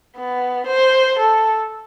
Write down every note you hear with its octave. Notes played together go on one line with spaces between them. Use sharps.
B3
C5
A4